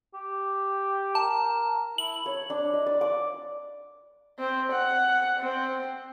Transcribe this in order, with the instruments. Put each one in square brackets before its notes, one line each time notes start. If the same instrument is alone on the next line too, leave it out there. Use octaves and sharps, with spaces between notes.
[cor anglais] G4
[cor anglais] A#4 [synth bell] A5
[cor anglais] E4 [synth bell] F#7
[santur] C#5
D4
D#5
D5
D6
[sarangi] C4
F#5
C4